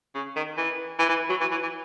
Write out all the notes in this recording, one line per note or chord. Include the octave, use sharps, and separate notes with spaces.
C#3
D#3
E3
E3
E3
F#3
E3
E3
E3